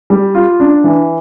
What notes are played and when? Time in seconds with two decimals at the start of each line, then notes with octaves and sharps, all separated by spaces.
0.10 G3
0.35 F4
0.60 D4
0.84 E3